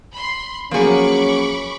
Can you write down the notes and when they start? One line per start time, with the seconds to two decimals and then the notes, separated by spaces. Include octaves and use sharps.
0.12 B5 C6
0.71 F3 F#3 A#3 C#4 G#4 B5 C#6 D6